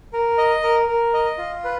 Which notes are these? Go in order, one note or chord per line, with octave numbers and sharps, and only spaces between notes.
A#4
D#5
A#4
A#4
D#5
F4
B4